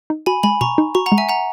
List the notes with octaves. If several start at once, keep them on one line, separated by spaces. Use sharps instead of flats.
D#4
F#4 G#5 B5
G#3 G#5 B5
B2 A#5 C#6
D#4
F#4 A#5 C#6
F#5 A#5
G#3
E5 G#5
F#5 A#5